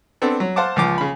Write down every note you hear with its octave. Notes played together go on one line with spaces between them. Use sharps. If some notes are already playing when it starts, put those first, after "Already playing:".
B3 C4 D4 A4
F#3
C5 F5 F#5 A5 D6
C#2 F3 D6
C#3 B5